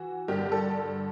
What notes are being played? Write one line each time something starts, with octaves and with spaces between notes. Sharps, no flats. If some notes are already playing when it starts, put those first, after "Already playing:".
Already playing: E3 F#4
G2 D3 G4
A4